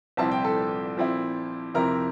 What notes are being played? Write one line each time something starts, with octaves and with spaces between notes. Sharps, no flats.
C2 A#2 F3 C4 E4 A5
G5
A4 A5
A#2 F3 C4 E4
F2 C3 F3 C4 E4 A#4 A#5